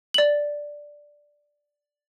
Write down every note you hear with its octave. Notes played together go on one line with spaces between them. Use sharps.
D5 F#7